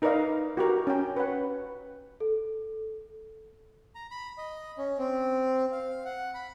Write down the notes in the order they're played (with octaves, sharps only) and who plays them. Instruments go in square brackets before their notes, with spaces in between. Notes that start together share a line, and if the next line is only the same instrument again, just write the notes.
[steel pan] D#4 A#4 B4 D5 D#5 F5
F#4 G4 A#4
C#4 G5
B4 C#5 F#5
[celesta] A4
[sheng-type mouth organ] A#5
B5
D#5
C#4
C4
F5
F#5
B5